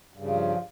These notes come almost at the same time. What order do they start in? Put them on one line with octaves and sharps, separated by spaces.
G2 C#3 F3